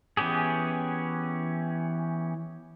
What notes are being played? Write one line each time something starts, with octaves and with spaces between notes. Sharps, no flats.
E3 B3 C#4 G4 G#4